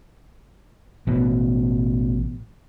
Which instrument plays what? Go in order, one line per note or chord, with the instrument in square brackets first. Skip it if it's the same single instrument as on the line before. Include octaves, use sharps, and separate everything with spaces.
[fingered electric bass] A1 B2